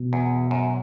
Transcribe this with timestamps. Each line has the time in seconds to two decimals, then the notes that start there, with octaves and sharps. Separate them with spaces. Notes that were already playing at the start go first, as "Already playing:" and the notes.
Already playing: B2
0.13 E2
0.51 F#2